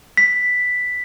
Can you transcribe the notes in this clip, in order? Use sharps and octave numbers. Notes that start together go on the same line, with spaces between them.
B6